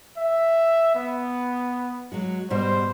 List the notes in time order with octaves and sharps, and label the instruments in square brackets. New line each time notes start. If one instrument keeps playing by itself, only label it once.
[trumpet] E5
B3
[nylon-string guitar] F#3 G#3 F#4
[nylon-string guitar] G#2 B2 G3 [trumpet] C5